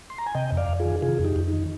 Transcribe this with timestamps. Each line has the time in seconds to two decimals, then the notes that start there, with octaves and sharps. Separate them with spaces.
0.10 C6
0.18 A#5
0.26 G#5
0.34 C3 D#5 G5
0.52 F2
0.57 D5 F5
0.69 F2
0.80 F4 G#4
0.85 D#3
1.02 C3 F4 G#4
1.19 F2
1.25 D#4 G4
1.36 F2
1.48 D#4
1.53 D#3